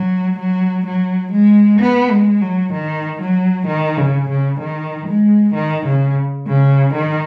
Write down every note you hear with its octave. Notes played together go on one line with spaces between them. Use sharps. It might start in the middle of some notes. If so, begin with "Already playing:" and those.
Already playing: F#3
F#3
F#3
G#3
B3
G#3
F#3
D#3
F#3
D#3
C#3
C#3
D#3
G#3
D#3
C#3
C#3
D#3